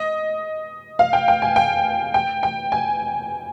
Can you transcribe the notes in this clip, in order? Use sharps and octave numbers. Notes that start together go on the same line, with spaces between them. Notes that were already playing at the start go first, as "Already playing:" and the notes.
Already playing: D#5
F5
G5
G5
G#5
G5
G5
G5
G#5